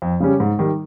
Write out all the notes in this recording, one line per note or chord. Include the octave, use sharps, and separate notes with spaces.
F2
C#3 G3 C#4 G4
G#2
D#3 G3